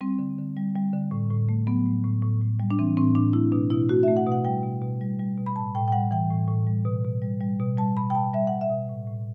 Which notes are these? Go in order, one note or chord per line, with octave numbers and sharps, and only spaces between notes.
G3 C4
D3
D3
G3
G3
D3
A2
A2
A3
F#3 B3
A2
A2
A2
A2
G3
D4
E3 C4
A2 C4
A2 D4
A3 E4
B2 D4
B2 E4
A3 F#4
A3 E5
F#5
B2
F#5
G3 G5
B2
B2
G3
G3
B2
B5
A2 A5
A2 G5
G5
G3 F#5
E3 G5
A2
A2
G3
B2
B2
G3
G3
B2
G3 A5
B2 B5
G5
B2 A5
G3 E5
G3 F#5
E5
B2
A2
A2